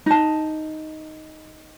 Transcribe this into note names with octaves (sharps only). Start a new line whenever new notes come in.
D#4 A5